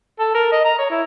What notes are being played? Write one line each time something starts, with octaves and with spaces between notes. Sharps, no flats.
A4
A#4
D#5
A#5
C#5
E4